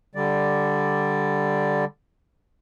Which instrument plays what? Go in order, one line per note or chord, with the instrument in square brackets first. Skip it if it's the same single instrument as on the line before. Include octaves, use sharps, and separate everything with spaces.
[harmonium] D3 G3 D5